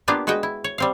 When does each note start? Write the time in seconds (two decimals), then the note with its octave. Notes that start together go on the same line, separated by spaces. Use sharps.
0.08 A#3 B3 D4 F4 G4 B4
0.27 G#3 F#4 B4 D#5 G5
0.43 E4
0.64 C#5
0.78 G3 C4 F5